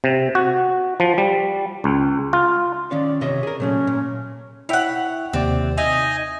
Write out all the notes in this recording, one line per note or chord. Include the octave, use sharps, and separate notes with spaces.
C3
F#4
F3
G3
C#2
F4
D#3 C#4 D5 F5
C3 C#5 D#5 E5
G#4 A#4
A#2 F#3 A3 C#4
A#2
E4 C#5 E5 F#5 G5
D#2 C3 C4 D5
D#4 D#5 E5 G#5